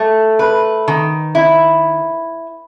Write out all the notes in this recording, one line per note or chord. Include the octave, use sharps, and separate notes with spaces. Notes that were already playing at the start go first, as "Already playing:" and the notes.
Already playing: A3
B4
D#3
E4